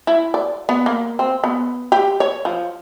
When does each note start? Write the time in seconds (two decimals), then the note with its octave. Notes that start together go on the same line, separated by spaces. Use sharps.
0.07 E4
0.34 D5
0.69 B3
0.86 A#3
1.19 C4
1.44 B3
1.92 G4
2.20 C#5
2.45 F3